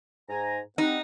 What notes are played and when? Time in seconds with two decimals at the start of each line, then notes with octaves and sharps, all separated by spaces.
0.29 G#2 G#5 A#5
0.78 G3 C4 D#4 F#5